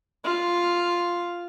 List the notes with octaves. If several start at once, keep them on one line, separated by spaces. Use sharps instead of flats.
F4